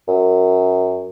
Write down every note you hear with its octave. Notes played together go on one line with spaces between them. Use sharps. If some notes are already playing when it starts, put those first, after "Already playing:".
F#2